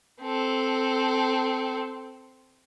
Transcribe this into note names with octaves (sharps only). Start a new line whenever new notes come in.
C4 A4